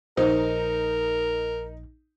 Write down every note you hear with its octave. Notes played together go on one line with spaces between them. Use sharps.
A#1 D#4 A#4 C5